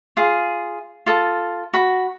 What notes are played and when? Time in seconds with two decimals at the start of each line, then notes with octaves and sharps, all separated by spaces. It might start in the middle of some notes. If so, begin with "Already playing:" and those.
0.17 F4 G#4
1.06 F4 A4 D#6
1.74 F#4 B5